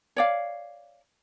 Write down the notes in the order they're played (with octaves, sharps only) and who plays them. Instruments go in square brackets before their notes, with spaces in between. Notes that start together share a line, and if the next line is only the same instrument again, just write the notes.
[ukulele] C#5 D5 F5